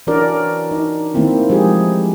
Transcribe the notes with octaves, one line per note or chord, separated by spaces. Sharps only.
E3 C#4 D4 F#4 A#4 D5
D#4
D#3 A3 A#3 C4 E4
F3 G#3 G4 G#4